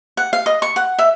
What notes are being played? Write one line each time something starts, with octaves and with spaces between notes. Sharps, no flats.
F#5
F5
D#5
C#6
F#5
E5